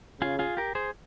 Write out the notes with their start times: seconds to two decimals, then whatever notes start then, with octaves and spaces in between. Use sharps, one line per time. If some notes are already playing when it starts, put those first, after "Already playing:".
0.21 C#3 F4 G#4
0.39 F4 G#4
0.57 G4 A#4
0.75 G#4 C5